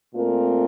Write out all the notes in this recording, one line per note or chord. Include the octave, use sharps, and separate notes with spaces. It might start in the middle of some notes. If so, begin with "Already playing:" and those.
A#2 A3 C4 F4 A#4